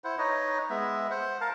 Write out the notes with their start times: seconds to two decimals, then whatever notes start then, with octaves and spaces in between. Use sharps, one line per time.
0.04 E4 C5 F#5
0.18 D#4 B4 C#5 D#5
0.70 G#3 B3 E5
1.11 C5 F#5
1.41 A#4 F5 A5